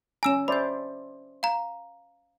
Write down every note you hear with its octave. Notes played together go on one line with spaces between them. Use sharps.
C#4 G#5 A#5 E6 E7
C5 D5 E5 B5 G6
F5 A#5